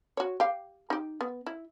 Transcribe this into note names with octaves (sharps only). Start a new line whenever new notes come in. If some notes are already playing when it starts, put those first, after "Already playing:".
F#4 C#5
G4 F5
D#4 G4
B3
E4